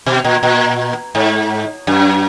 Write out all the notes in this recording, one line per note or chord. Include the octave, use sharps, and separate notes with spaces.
B2
A#2
A#2
G#2
F#2